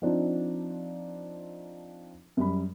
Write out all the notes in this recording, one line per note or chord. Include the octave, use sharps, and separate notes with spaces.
F3 C4 D4 D#4 F4
F#2 G3 B5